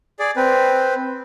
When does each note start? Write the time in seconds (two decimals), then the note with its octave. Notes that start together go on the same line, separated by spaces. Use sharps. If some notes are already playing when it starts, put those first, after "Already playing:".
0.19 G#4 D5
0.36 C4 B4